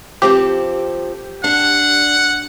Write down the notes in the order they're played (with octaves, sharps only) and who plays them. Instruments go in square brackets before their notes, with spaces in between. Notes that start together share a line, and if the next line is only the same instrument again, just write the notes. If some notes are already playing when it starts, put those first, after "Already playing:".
[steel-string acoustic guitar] F3 C4 A4 [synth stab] G4
[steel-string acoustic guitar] D4 [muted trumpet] F#5